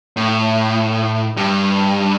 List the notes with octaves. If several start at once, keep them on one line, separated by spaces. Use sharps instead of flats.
A2
G2